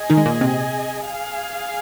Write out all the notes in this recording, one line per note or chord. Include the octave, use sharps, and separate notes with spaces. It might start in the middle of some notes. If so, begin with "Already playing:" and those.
Already playing: G#4 D#5 G#5
D#3 D#4
G#3
A#2 A#3
C3 C4
G#4 F5 G#5